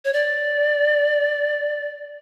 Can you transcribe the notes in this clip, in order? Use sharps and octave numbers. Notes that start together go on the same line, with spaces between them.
C#5
D5